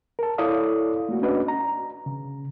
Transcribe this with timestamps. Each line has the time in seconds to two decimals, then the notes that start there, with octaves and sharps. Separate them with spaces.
0.19 A#4 A5
0.38 E4 A4 C#5 D5 F5 D#6
1.09 A3 A#3 F#4
1.22 C#4 D4 F#4 B4 D5 D#5
1.48 A#5
2.06 C#3